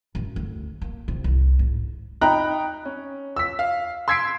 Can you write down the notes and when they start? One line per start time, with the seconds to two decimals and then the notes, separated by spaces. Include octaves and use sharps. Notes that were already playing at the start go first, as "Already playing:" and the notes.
0.15 F#2
0.36 D2
0.82 A#3
1.08 C3
1.24 C2
1.59 G#2
2.21 D#4 G5 A#5 B5 F#6
2.85 C#4
3.36 E6 B6
3.59 F5
4.08 C6 E6 G#6 B6 C7 D7